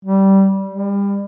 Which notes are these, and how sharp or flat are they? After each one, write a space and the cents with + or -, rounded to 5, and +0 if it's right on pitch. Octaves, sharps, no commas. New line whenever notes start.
G3 -15
G3 +30